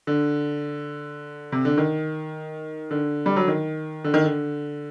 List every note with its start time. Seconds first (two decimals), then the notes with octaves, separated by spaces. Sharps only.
0.07 D3
1.52 C3
1.65 D3
1.78 D#3
2.91 D3
3.26 G3
3.36 F#3
3.48 D#3
4.04 D3
4.14 D#3
4.24 D3